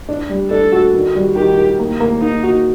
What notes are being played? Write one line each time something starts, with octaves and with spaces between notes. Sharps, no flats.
D4
G3
D4 A4
F#4
D#3
G3
D#3 G4
D#3
A#3
A#3
A#3 D#4
F#4